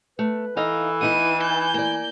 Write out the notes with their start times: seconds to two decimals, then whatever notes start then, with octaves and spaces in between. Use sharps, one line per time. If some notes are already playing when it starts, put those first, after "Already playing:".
0.19 A3 B4
0.57 E3 D#4 A4 D#5 F5
1.01 B3 D#4 E4 D#7
1.43 G#5 G6
1.74 A#3 D5